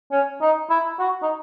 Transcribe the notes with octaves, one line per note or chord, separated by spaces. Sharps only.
C#4
D#4
E4
F#4
D#4